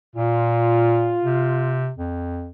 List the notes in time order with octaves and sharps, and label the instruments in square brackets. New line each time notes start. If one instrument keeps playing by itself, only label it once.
[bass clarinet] A#2 [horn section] F4
[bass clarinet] C3
F2